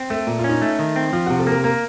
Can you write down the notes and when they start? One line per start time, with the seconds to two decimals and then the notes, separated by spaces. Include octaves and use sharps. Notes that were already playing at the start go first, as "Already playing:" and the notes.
Already playing: C4
0.10 A3 A4
0.27 A#2
0.39 F4
0.44 C#4
0.49 D#4
0.62 A3
0.79 D#3
0.96 C4
1.13 F3 F4
1.26 C3 F#4
1.39 A4
1.47 A#3 A#4
1.64 A#3 A#4